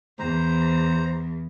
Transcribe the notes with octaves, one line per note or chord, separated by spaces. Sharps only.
E2 C5 A#5